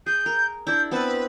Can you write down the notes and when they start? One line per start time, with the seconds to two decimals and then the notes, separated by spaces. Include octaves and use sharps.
0.06 G#4 G6
0.26 A#4
0.67 D4 E4 G6
0.91 B3 C4 B4 A5